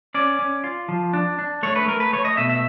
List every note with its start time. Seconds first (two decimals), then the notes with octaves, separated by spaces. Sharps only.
0.14 C#4 D5
0.39 C#4
0.64 F4
0.88 F3
1.13 D4
1.39 D4
1.63 A3 C#5
1.76 B4
1.87 A3 A#4
2.00 B4
2.13 A3 C#5
2.25 D#5
2.37 B2 E5
2.49 E5